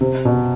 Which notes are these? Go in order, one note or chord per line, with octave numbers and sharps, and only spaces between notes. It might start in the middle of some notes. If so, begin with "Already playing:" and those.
C3
B2